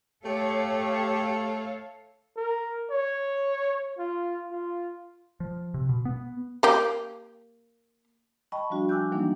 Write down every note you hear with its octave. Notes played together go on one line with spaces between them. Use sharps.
A3 G4 A4 C#5 F5
A#4
C#5
F4
F4
F3
C3
B2
B3
A#3 G4
D#5 G5 A5 B5 C#6
F3 G3 D4 F#4
G5 G#5 D6 E6 F#6 G6
E3 F#3 G3 A#3 D4 D#4